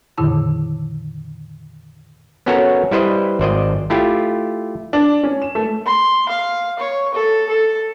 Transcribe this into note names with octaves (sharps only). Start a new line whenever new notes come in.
F2 A#2 D3 D#3 E4 A5
B3 C#4 F#4 A4 A#4 C#5
G3 E4 B4 C5 D#5
G#1 C5 D5 D#5
A3 E4 F4 G4
D4
C#4
E7
A3
C6
F5
C#5
A4
A4